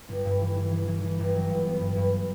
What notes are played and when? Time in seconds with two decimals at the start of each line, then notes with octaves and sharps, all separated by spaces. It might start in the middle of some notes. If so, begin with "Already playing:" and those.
0.09 G1
0.25 G2
0.41 E3
0.56 E3
0.72 E3
0.87 E3
1.03 E3
1.19 G1
1.34 F#3
1.50 G2
1.65 B3
1.81 G2
1.96 G2